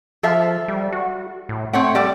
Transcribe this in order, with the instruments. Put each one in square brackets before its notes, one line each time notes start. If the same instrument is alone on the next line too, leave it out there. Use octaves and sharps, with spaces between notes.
[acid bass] F3 [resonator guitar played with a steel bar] A4 E5 F5
[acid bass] G3
F#4
A2
[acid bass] A3 [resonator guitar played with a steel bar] C4 C#5 F#5
[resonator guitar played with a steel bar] G3 A4 D5 [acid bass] G4